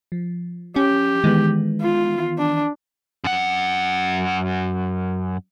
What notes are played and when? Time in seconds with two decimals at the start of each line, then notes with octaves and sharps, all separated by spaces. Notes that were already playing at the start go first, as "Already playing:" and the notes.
0.12 F3
0.76 C#4 G4
1.24 D#3 E3 G#3 B3
1.81 F4
2.38 D4
3.24 F#2 F#5